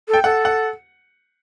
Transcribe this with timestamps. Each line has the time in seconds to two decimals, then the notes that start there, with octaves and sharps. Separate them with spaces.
0.08 A4
0.13 G5
0.24 A4 F#5
0.45 F#5